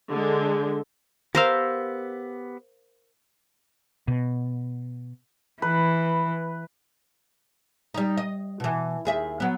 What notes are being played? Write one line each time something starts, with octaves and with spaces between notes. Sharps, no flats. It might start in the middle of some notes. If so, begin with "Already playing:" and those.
D3 G#3
B3 G4 A#4 C5 F5 E6
B2
E3 B4
G3 D#4
D#5
B2 E3
D#2 G#4 E5
F#3 B3